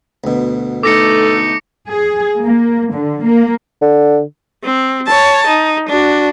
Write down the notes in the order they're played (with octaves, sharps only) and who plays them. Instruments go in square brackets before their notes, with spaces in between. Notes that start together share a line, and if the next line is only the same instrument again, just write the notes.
[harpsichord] D2 B2
[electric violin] A3 D#4 [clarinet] A4 [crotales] D6 A#6 C#7
[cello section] G#4
A#3
D3
A#3
[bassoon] D3
[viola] C4
C#5 A5
D#4
D4 F#4